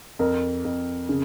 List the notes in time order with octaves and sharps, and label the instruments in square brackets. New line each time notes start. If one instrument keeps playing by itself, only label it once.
[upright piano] F2 A#4
F2
C#3